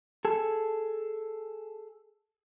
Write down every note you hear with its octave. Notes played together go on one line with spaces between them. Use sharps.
G#4 A4